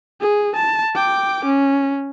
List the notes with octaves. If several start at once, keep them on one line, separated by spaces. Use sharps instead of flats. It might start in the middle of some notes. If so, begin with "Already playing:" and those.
G#4
A5
G5 D6
C#4